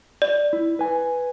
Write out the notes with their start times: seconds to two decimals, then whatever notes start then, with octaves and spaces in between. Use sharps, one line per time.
0.22 D5
0.53 E4
0.79 B4 G#5